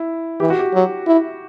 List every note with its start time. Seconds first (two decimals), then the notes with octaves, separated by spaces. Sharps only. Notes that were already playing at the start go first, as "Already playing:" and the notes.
Already playing: E4
0.40 E3 G4
0.50 F#4
0.59 G4
0.74 F#3
1.07 E4